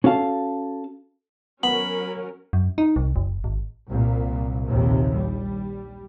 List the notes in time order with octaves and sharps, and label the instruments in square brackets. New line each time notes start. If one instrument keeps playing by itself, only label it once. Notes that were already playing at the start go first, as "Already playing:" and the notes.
[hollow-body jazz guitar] C#4 F#4 A4 F5 A5
[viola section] F#3 C#4 A#4 [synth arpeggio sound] B3 [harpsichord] B5
[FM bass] F#2
D#4
C2
F#1
G#1
[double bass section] C2 A#2
A#1 D#2 C3
G3